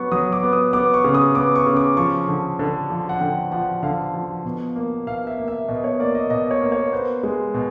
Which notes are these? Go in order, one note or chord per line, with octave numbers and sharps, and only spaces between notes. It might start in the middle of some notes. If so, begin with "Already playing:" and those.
Already playing: F#3 B3 C#6
F#3 D#6
D6
B3
D#6
B3 D6
C#6
C#3
D#6
B3 D6
C#6
C#3
D6
F3 C#6
D3
D3
F3
F#5
D3 G5
F3 F#5
D3 F5
F3
B2
A#3
B2 F5
E5
A#3
E5
B2 D#5
C#5
A#3 D5
D#5
B2 D#5
C#5
A#3
C#5
B3 C5
G#3
B2